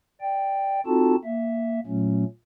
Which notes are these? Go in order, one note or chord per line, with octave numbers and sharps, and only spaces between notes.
D5 G5
C4 D#4 F4 F#4 A4 A5
A#3 E5
A#2 F#3 A3 C#4